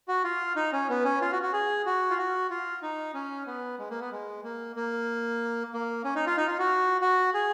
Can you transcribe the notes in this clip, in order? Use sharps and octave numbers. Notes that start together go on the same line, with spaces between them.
F#4
F4
D#4
C#4
B3
C#4
F4
F#4
F#4
G#4
F#4
F4
F#4
F4
D#4
C#4
B3
G#3
A#3
B3
G#3
A#3
A#3
A#3
C#4
D#4
F4
D#4
F4
F#4
F#4
G#4